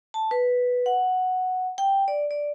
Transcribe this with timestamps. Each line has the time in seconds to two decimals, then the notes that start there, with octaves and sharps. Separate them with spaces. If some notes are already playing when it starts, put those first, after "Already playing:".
0.14 A5
0.31 B4
0.86 F#5
1.78 G5
2.08 D5
2.31 D5